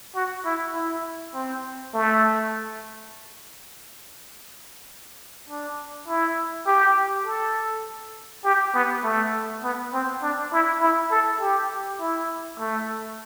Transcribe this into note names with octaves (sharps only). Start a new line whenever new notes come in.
F#4
E4
E4
C4
A3
D4
E4
G4
A4
G4
B3
A3
B3
C4
D4
E4
E4
A4
G4
E4
A3